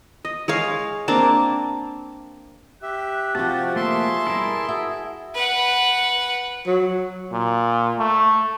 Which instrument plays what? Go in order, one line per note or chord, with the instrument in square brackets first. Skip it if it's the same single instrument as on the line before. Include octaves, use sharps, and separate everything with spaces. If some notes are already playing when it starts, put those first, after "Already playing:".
[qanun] D#5
G#3 C#5 F5
A#3 C4 D4 A5
[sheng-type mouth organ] G4 E5 [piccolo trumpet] F#6
[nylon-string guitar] C3 F3 [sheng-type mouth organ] F#4 G4 [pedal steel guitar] A5
[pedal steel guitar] A3 A#3 [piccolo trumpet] G#4 [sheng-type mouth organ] E5 A5 C6
[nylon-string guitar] B2 G3 [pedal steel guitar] E4 A#4
[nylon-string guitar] F#4 E5
[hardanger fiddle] B4 F#5
[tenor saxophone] F#3
[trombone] A#2
A3